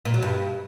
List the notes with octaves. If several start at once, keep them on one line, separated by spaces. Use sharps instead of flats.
A#2
F#3
G2